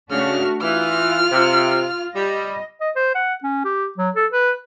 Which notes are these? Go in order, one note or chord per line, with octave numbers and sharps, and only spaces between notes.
C#3 A3 D4 F#4 F6
E3 F4 F6
C3
G3 D#5
D#5
C5
F#5
C#4
G4
F#3
A4
B4